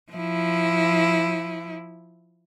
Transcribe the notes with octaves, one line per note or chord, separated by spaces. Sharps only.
F3 E4